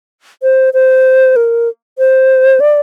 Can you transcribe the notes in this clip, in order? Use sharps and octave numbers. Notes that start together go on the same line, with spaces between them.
C5
C5
A#4
C5
D5